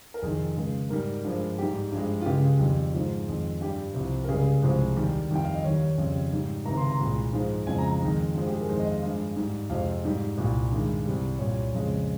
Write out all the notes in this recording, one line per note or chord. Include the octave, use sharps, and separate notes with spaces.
A#4
F2 C3 D#3 G#4
C#2 C#3 G#3
G#2 G3 A#4
G2 F3 G#3
G#2 G3 G4
G2 F3 G#3
F4
C#2 C#3 G#3 G4
F2 D#3 G3
G#2 F3 G#3 F4
F2 D#3 G#3
G2 G3 G4
C2 C3 F3
A#4
C#2 C#3 G3 G#4
C2 C3 F3 G#3
D#2 D#3 G3
F2 D#3 G3 G5
F5
D#5
D#2 D#3 G3 C#5
F2 C#3 G3
G#2 G3
C#2 C3 D#3 A#5
C6
A#5
C2 A#2 G#3
G#2 F3 G#3
F2 C#3 F3 G#3 G#5
A#5
A#5
F2 D#3 G#3
G2 F3 G#3
G4
G#4
A#4
F2 D#3 G#3 C5
D#5
F5
G2 F3 G#3 F5
G#2 G3
F2 C3 F3 G#3 F5
G#2 G3
C2 A#2 G3
G2 D#3 G#3
C2 C3 G3
C2 A#2 G3 C#5
F2 C#3 F3 G#3